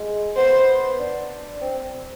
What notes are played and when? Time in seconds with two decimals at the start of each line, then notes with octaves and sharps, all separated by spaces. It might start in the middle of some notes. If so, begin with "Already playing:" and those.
Already playing: G#3
0.37 B3 C5
1.00 D4
1.62 C4